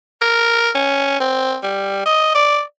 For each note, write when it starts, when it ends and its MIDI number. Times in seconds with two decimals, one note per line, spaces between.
0.21 0.70 70
0.75 1.19 61
1.20 1.58 60
1.63 2.02 55
2.06 2.30 75
2.35 2.62 74